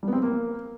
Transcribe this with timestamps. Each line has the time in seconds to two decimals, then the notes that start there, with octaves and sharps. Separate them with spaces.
0.03 G3
0.08 B3
0.13 C4
0.18 B3
0.23 A#3